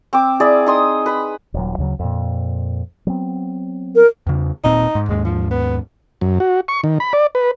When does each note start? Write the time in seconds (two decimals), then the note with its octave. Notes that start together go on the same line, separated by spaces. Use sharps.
0.13 C4 D6
0.40 E4 G#4 D5
0.67 D#4 C6 D#6
1.06 B4 B5
1.54 D#1 F#3
1.78 D2 C#3 F#3
1.99 F2 A#2
3.07 F#3 B3 C4
3.96 A#4
4.27 E2 C#3
4.64 D#1 A#2 C4 D#4
4.95 G#2
5.09 D#2 G#2 G#3
5.25 F3
5.51 B3
6.21 F#2
6.40 F#4
6.68 C#6
6.84 D#3
7.00 B5
7.13 D5
7.35 B4